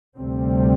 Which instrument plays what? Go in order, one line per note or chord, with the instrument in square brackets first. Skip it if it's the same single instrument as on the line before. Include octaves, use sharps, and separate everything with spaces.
[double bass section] D2 C3 G3 C4